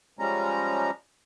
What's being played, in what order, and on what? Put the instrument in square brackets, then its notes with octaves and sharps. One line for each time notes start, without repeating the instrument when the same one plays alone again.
[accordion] F3 G3 G#3 C#4 A#5